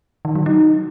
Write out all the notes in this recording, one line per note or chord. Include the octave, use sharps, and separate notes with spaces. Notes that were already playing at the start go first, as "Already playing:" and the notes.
D#3
F#3
D#4